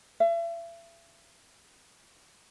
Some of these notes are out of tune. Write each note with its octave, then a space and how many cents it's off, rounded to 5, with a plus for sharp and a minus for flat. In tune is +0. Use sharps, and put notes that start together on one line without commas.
E5 +40